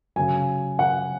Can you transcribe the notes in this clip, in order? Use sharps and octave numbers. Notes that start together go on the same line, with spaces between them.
C#3 F#3 G#5
F#5